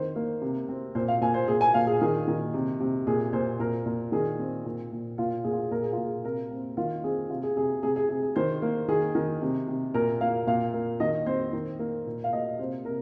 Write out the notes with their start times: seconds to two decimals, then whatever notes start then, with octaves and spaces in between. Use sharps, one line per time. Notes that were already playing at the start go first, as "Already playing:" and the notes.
Already playing: D#3 C4 C5
0.16 A#3
0.42 C3
0.69 C4
0.95 A#2 C5
1.08 F5
1.21 A#2 G#5
1.34 C5
1.48 A#2 G#4
1.61 G#5
1.74 A#2 F5
1.87 G#4
2.01 D#3 G#4
2.28 D#3
2.54 C3
2.80 C3
3.07 A#2 G#4
3.33 A#2 C5
3.59 A#2 A#4
3.86 A#2
4.12 D#3 G#4
4.39 C4
4.65 A#2
4.92 A#2
5.18 A#2 F4
5.44 A#2 G#4
5.52 F4
5.60 G#4
5.71 A#2 A#4
5.82 G#4
5.92 A#2 F4
6.04 G#4
6.24 C3 A#4
6.51 C4
6.77 D#3 F4
7.04 C4 G#4
7.29 C3 F4
7.43 G#4
7.57 C3 G#4
7.83 C3 G#4
7.96 G#4
8.09 C3 G#4
8.23 G#4
8.36 D#3 C5
8.62 A#3
8.88 D#3 G#4
9.15 D#3
9.42 C3
9.68 C3
9.94 A#2 A#4
10.21 A#3 F5
10.47 A#2 F5
10.74 A#3
11.00 D#3 D#5
11.26 C4 C5
11.53 D#3
11.79 A#3
12.06 A#2
12.24 F5
12.32 A#2 D#5
12.59 C3 C5
12.85 C3 A#4